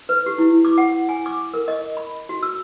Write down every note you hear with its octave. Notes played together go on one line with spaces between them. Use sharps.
B4
G4
E4
D6
F#5
G#5
D6
A#4
D#5
B5
F#4
E6